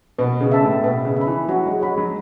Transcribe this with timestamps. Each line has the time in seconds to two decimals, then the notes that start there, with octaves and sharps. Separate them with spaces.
0.19 B2 B4
0.41 C#3
0.52 E5 A5
0.62 A2
0.84 B2 B4
1.05 C#3
1.17 E5 B5
1.27 E3
1.49 F#3 F#4
1.66 G#3
1.81 G#3 C#5 F#5 B5
1.98 F#3